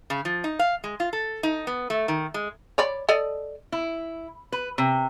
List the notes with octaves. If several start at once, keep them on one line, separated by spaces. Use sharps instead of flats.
C#3
F3
D#4
F5
G#3
F4
A4
D#4
B3
A3
D#3
G#3
C#5 D5 B5
A4 D5 D#5
E4
B4
C3